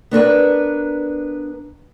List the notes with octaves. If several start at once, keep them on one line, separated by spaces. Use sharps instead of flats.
B3 D4 A#4 B4